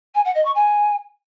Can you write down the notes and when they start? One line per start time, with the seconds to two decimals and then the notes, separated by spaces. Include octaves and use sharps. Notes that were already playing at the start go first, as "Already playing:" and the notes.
0.15 G#5
0.25 F#5
0.35 D#5
0.45 C#6
0.55 G#5